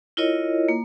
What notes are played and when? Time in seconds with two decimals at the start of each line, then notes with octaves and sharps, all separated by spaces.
0.17 E4 F4 A#4 C#5 D#5
0.68 A#3